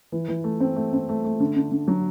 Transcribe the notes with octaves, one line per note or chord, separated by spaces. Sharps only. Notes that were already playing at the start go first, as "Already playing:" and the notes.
E3
E3
A3
C4
A3
C4
A3
A3
D3
D3
D3
F#3